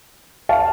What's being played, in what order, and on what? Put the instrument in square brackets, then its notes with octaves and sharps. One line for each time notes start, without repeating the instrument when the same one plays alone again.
[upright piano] F5 A5